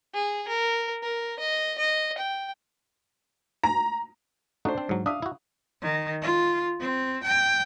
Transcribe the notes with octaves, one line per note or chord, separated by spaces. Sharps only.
G#4
A#4
A#4
D#5
D#5
G5
A#5
A3 D4 D#4 F#4 C5
C4
G#2 F#3
D4 E5 F5 D#6
E4 F#4
D#3
F4
C4
G5